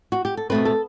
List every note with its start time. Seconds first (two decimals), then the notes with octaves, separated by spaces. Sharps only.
0.12 F#4
0.25 G4
0.37 A4
0.50 B2 A3 C4 B4
0.65 A4